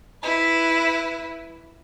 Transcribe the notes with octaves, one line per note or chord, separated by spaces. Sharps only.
E4 B4